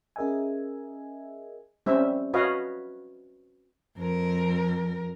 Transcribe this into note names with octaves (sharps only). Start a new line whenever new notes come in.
C#4 G#4 A#4 D#5 E5 G#5
G3 C4 C#4 E5
F#4 B4 C#5 D#5 F5
F2 A#4